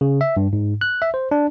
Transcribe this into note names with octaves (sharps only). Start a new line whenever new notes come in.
C#3
E5
G2
G#2
F#6
E5
C5
D4